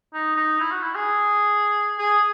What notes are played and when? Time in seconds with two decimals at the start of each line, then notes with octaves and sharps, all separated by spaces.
0.14 D#4
0.36 D#4
0.60 E4
0.71 F#4
0.83 E4
0.95 G#4
1.99 G#4